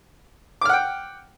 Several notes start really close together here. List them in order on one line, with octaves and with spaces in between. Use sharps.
D6 F6 F#5 G5